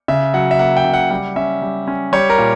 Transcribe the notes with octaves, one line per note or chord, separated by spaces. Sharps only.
C#3 E5
F#3 F#5
E5
A#3 F#5
G5
C#3
F#5
G3 F#5
C#4 E5
G3
C#4
G3 C#5
A#4
A#2